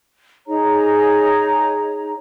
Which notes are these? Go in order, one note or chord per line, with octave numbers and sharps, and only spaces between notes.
D#4 G#4 C#5 A#5